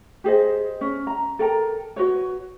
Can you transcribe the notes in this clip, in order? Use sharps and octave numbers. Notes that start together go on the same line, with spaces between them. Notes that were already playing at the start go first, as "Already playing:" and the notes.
G4 G#4 C5 D#5
C#4
A#5
A4 A#4 G5 A#5
F#4 B4 C#5